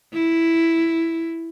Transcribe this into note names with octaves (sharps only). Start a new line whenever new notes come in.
E4